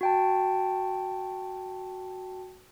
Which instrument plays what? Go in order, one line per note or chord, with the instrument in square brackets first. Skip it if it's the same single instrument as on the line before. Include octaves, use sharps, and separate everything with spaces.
[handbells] F#4 G5 A5